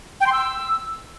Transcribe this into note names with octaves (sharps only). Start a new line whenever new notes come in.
G5
C6
E6